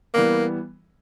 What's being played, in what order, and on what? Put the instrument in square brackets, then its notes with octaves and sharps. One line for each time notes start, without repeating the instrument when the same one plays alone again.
[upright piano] E3 G3 B3 [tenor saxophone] A#3